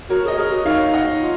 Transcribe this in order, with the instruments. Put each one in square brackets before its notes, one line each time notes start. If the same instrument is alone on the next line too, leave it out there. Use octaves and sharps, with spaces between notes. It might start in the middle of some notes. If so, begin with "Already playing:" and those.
[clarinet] F#4 [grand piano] A#4 C#5
[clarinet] G#4 [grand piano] D#5
[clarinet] G#4 [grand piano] A#4 C#5
[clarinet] F#4
[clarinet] D#4 [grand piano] C#5 F5
[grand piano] D#5 F#5
[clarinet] F4